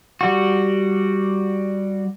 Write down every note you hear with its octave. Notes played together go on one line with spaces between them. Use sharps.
G3 F#4